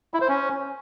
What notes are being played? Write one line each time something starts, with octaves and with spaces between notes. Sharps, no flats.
E4
C5
C#4